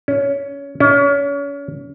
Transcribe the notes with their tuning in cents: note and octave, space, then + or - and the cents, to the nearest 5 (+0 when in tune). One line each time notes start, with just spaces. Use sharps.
C#4 +20
C#4 +35